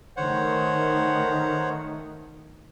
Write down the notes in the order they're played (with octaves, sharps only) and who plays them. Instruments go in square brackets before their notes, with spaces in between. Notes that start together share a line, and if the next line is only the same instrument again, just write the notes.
[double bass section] D#3 A3 [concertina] C5 C#5 F#5